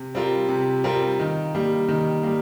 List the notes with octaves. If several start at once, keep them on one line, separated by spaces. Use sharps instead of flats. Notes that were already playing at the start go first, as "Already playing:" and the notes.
Already playing: C3
G3 C4 F4 A#4
C3
G3 C4 F4 A#4
D#3
G3 A#3
D#3
G3 A#3